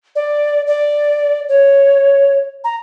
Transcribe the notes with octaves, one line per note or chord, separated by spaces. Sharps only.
D5
D5
C#5
A#5